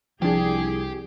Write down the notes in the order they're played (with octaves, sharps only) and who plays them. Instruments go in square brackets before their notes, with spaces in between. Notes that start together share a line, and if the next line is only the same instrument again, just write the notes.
[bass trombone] C2 [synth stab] F3 D4 [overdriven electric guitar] G4 [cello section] G#4